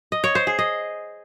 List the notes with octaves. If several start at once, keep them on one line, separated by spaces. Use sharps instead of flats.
D#5
C#5
C5
G#4
D#5